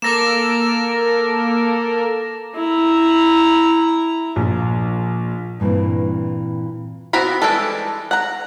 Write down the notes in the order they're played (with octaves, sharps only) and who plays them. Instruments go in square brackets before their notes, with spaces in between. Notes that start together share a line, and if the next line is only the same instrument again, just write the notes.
[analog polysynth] A#3 A4 A#4 [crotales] D6 A#6 E7
[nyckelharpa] E4 A#5
[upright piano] A#1
[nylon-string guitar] G2 A#2 E3 C4
[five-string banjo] B3 C4 F#4 A#5 B5
E3 G3 G#3 D4 A4
F#5 A#5